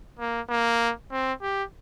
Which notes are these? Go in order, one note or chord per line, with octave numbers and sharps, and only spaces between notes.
A#3
A#3
C4
G4